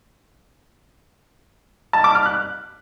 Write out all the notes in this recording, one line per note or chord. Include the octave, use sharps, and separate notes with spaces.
A5
D6
F6
F#6